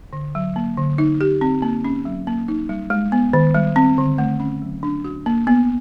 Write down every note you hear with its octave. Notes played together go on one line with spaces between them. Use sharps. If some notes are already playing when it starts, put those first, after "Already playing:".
D3
F#3
A#3
D3
D#4
G4
C4
A#3
C#4
F#3
A#3
D#4
G3
G#3
B3
D#3
G3
C4
D3
A3
C#4
F#3
D4
F#4
A#3
B3